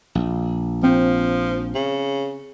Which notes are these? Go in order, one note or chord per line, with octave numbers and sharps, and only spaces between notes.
A#1
F3 C4 G5
C#3